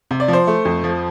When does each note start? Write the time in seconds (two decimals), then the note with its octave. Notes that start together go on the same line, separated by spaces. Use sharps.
0.11 C3
0.20 D5
0.28 F3
0.33 C5
0.47 A3
0.65 F2
0.84 F3